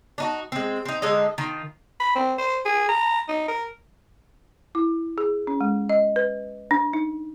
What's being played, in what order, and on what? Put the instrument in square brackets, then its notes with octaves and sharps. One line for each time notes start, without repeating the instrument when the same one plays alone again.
[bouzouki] D4 D#4 F#4
G#3 C4
C4 D#4
D3 G#3 D#4 D#5
D#3 F4
[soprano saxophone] B5
C4
C5
G#4
A#5
D#4
A#4
[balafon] E4
G#4
C#4
G#3
D#5
B4
D4
D#4